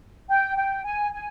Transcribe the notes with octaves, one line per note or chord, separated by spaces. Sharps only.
G5
G5
G#5
G#5